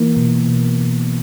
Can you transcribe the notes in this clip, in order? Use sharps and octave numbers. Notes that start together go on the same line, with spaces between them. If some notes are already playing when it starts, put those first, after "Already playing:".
Already playing: E3 A#3
B2
B2
B2